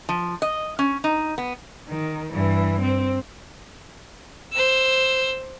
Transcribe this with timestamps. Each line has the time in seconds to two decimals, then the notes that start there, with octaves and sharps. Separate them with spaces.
0.09 F3
0.42 D#5
0.79 C#4
1.04 D#4
1.38 B3
1.88 D#3
2.32 G2 E3
2.82 C4
4.53 C5 E6